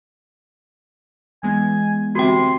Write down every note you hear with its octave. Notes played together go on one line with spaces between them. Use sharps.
E3 G#3 B3 G#5
D2 C3 F#4 G5 C6